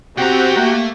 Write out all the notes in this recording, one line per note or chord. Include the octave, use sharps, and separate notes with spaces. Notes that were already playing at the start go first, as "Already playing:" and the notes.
B2 C4 F#4 G4 G5 A#5
A3 A#3